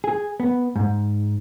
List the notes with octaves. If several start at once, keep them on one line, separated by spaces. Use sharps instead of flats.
G#4
B3
G#2